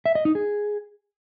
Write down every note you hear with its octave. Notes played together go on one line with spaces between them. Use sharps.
E5
D#5
D#4
G#4